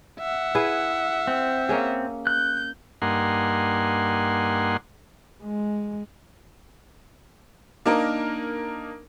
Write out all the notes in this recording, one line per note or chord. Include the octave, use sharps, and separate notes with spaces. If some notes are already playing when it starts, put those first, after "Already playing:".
E5 F#5
E4 G#4 B4
C4
A#3 C#4 G#4
F#6 G6
G2 A#3 D#4 F#5 G#5 C6
G#3
A#3 D4 D#4 A#4